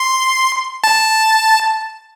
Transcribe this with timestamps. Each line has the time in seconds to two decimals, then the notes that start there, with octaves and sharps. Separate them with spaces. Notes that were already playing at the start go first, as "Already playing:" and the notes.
Already playing: C6
0.84 A5